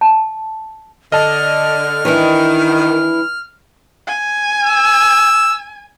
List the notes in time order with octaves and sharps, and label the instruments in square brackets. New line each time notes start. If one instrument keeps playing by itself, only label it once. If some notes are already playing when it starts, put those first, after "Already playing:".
[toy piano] A5
[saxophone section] D3 [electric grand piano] D#5 A5 [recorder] F6
[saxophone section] D#3 [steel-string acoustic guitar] E3 D4 E4
[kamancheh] G#5
[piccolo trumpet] E6